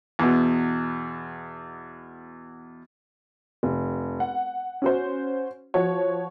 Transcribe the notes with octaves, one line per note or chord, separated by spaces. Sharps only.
E2 B2
F1
F#5
C#4 F#4 C5
F3 F#4 C#5